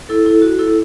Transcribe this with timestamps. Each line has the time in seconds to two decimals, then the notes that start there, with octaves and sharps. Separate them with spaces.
0.09 E4 A4
0.25 E4 A4
0.42 F#4
0.59 E4 A4